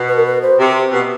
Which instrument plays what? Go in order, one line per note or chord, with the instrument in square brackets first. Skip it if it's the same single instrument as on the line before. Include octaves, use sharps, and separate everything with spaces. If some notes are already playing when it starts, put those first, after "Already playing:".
Already playing: [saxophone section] B2
[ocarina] B4
A#4
B4
C5
[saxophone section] C3
B2